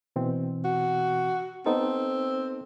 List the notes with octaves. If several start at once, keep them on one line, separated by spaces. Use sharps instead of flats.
B2 E3 C4
F#4
B3 C4 D#4 A4